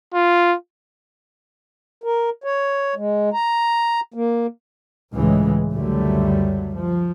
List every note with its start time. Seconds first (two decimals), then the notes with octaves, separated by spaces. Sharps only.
0.14 F4
2.04 A#4
2.44 C#5
2.96 G#3
3.33 A#5
4.14 A#3
5.15 C#2 A2 E3 G#3
5.71 C#2 F#2 D3 F#3 G3 A3
6.73 F3